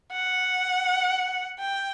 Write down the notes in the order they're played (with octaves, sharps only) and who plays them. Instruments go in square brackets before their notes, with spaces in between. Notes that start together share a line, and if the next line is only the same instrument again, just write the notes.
[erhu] F#5
G5